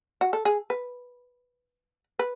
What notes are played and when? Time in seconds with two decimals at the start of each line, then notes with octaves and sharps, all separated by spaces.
0.21 F#4
0.33 A4
0.45 G#4
0.70 B4
2.19 B4